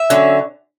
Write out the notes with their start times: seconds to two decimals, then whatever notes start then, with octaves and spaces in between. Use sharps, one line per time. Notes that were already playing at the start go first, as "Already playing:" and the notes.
Already playing: E5
0.10 D3 F#3 C#4